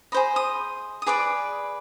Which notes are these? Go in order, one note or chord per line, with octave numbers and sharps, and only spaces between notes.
G#4 C5 D#5 B5
D#6
D#6
G#4 B4 D5 D6